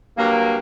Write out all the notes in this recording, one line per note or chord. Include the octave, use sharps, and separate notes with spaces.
G2 F#3 A#3